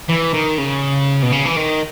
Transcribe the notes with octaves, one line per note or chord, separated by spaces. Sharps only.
E3
D#3
C#3
B2
C#3
E3
D#3